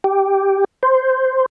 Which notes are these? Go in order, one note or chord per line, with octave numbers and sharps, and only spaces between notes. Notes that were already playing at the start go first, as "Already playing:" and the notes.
G4
C5